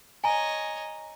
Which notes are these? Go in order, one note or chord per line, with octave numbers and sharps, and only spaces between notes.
C#5 D#5 G#5 A#5